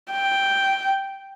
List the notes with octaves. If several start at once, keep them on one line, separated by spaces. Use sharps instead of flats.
G5